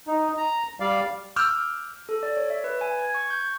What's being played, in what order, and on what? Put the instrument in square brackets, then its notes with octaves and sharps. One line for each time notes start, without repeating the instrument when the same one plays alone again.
[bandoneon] D#4
A#5
G3 D5 F5
[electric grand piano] D6 E6 F6 G6
[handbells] A4
D5
C#5
E5
B4
G#5
G#6
C#6
G6